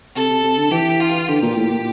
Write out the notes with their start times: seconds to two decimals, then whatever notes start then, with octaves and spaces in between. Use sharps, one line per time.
0.15 C3 A4
0.31 C3
0.44 C3
0.57 D3
0.71 E3 G4
1.00 F4
1.28 D3 G4
1.43 A#2
1.57 A2
1.71 A#2